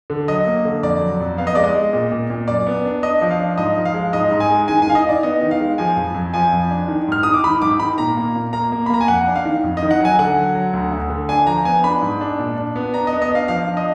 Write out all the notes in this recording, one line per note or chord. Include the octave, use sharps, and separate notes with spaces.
D3
F#3 D#5
A#3
D3
F2 D5
F#3
F2
B3 F5
D#5
G#3 D5
D#5
G#3
A#2
A#2
A#2
F#2 D5
B3
D4
D4 D#5
F3
F5
D4
G#2 D#5
F3
F5
G#3
G#2 D#5
G#2
G#5
G#3
D#3 G#5
G#5
D#3 F5
D#5
D#3 D5
B3 D#5
D#3
F5
G#3
F3 G#5
F2
F2
F3 G#5
F2
D4
D#3
G#2 F6
D#3 D#6
D6
D#3 B5
G#2 D6
D#3 B5
A#2 A#5
A#3
A#2
A#3 A#5
A#3
B5
A#3 A#5
G#5
F2 F#5
D4
F5
D#3
F2
D#5
D#3
F#5
F#3 G#5
D3 F#5
F#3
F#3
D2
D2
D3
D4 G#5
F3 A#5
B3 G#5
D4 B5
G#2
D4
A#2
D4
B3
D4 A#5
D#5
B3
D#5
D4 F5
F3 F5
D4
D#5